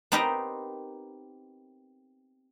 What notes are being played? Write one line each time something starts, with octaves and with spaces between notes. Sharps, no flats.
B3 C4 D#4 G4 A#4 D#5